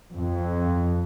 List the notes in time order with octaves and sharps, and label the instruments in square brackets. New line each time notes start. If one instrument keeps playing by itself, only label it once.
[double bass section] F2